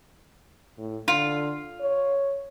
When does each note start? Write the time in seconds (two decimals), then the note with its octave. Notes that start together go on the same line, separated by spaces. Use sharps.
0.78 A2
1.08 D3 F4
1.81 C#5